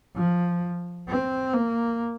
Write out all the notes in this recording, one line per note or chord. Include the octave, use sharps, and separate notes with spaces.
F3
C4
A#3